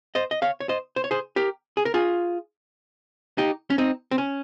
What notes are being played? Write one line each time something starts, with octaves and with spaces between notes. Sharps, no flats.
C5 D#5
D#5
C#5 F5
C#5
C5 D#5
C5
C#5
G#4 C5
G4 A#4
G#4
A#4
F4 G#4
D#4 G4
C#4
C4 D#4
C4
C#4